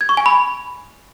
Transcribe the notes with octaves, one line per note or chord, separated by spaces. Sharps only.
G#6
C#6
G#5
B5